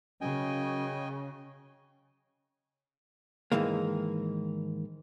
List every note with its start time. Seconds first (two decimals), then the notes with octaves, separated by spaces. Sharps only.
0.21 F#2 C#3 D#5 G5 G#5
3.52 G#2 D#3 E3 G#3 A#3